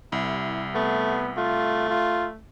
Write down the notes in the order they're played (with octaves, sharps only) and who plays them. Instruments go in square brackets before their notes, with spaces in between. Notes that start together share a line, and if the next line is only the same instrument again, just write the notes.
[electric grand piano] C2 [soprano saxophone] E4
[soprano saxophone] A3 [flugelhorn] B3
[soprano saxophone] A3 [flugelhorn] F4
[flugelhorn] F4